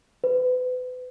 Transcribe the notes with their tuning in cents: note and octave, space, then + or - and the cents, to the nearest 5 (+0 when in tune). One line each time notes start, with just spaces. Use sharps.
B4 +35